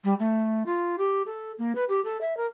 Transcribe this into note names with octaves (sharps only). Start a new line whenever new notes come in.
G3
A3
F4
G4
A4
A#3
B4
G4
A4
E5
A#4